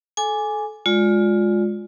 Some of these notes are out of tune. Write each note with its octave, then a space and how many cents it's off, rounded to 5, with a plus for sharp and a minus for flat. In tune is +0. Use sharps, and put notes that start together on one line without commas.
A4 -25 G#5 +0 D6 +0
G#3 +0 F4 +20 D5 +0